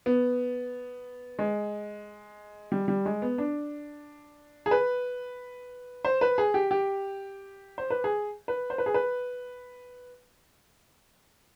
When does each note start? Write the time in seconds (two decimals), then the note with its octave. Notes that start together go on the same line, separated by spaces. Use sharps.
0.06 B3
1.39 G#3
2.72 G3
2.88 G3
3.06 G#3
3.22 B3
3.38 D4
4.66 G#4
4.71 B4
6.05 C5
6.21 B4
6.38 G#4
6.54 G4
6.71 G4
7.78 C5
7.90 B4
8.04 G#4
8.48 B4
8.70 C5
8.78 B4
8.86 G#4
8.94 B4